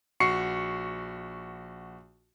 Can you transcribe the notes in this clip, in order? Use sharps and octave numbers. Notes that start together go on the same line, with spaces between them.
A#1 F#4 C#6 C7 C#7